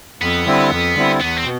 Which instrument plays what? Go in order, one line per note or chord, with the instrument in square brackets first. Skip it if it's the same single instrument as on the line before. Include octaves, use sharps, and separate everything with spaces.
[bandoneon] F2 [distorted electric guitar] B3
[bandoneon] D3 G3 C4 E4
F2
D3 G3 C4 E4
[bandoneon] E2 [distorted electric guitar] B3
[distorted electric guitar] C4
[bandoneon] B2